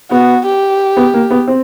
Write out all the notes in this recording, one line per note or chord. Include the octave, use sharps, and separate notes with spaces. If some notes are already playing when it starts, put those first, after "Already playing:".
B3 F#4
G4
B3
A#3
B3
C4